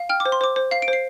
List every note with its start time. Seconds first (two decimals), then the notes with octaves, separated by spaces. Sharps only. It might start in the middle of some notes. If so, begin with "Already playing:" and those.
Already playing: F5
0.09 G5 F6
0.20 D6
0.25 C5
0.32 C6
0.41 C5 D6
0.56 C5
0.71 F5 C7
0.82 D7
0.88 C5
0.93 C7